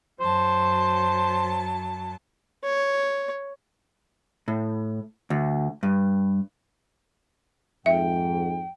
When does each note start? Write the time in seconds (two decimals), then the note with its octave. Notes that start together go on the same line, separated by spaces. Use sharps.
0.20 F#2 F#3 C5 A5
2.64 C#5
4.48 A2
5.30 D2
5.83 G2
7.86 F2 G#2 E5 G5